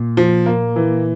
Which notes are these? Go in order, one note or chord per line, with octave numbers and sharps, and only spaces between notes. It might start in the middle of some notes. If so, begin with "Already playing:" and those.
Already playing: A#2
F3
A#3
E3